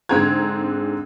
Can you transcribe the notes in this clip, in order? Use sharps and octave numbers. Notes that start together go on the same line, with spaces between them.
G#2 D3 C4 G#4 A#5 G#6